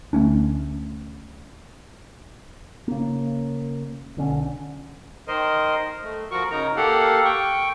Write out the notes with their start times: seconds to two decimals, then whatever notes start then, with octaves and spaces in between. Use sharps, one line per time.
0.13 D2 A3 C#4 D4
2.88 C#3 A#3
4.17 B1 D3 C#4
5.28 D#3 A#4 C5 D#5
6.03 A3
6.31 F3 F#4 A#4 C#6
6.51 C#3 D#4 A#4 A#5
6.77 A#3 G4 A4 F5 F#5
7.25 G5 C#6